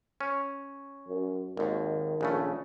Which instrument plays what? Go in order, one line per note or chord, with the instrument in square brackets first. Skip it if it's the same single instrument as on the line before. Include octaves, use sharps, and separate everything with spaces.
[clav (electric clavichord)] C#4
[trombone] F#2
[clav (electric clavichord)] G#1 D#2 [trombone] D#3
[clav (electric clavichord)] A#1 C#3 A3